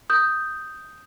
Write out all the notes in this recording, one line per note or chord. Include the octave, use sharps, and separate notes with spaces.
D#6 G6